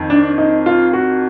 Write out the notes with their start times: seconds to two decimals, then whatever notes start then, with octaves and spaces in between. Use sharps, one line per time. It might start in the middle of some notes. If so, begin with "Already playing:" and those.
Already playing: F2 D#3
0.10 D4
0.38 D#4
0.66 F4
0.93 F#4